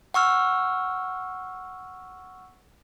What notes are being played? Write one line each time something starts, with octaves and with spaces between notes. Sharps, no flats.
F#5 C#6 E6 F6